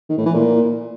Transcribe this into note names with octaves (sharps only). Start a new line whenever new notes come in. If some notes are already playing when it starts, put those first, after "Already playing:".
D#3
A2
E3
A#2